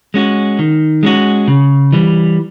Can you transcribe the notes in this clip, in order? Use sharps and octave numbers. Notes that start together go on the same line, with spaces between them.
G#3 C#4 F#4
D#3
G#3 C#4 F#4
C#3
E3 G3